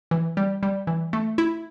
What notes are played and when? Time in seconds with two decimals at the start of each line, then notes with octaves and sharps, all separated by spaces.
0.11 E3
0.37 G3
0.63 G3
0.87 E3
1.13 A3
1.38 E4